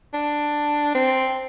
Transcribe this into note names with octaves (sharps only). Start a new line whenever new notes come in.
D4
C4